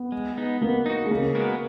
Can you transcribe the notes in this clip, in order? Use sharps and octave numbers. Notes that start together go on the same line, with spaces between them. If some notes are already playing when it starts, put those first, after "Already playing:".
Already playing: B3
G#3
B3 D#4
A#3 B3
D#4 F#4
G#3
C#3 A#3
G#3 B3 F#4 A#4